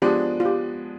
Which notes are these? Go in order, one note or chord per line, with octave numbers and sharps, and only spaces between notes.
F3 G#3 B3 D4 G4
F4
G4